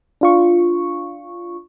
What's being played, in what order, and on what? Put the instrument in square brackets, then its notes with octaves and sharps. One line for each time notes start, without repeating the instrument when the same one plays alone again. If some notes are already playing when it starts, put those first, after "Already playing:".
[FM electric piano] D4 F4 C#6